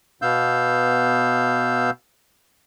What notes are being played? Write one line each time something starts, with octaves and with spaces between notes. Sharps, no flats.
B2 B3 F5 E6 G6